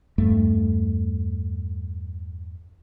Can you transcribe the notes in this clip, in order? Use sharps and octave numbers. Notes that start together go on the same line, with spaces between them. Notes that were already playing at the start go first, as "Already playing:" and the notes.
E2 G2 A3